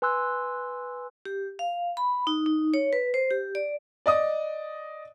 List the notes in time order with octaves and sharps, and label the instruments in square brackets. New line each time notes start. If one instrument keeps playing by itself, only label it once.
[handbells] B4 G#5 C6 E6 F#6
[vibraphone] G4
F5
B5
D#4
D#4
C#5
B4
C5
G4
D5
[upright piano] D5 D#5 D#6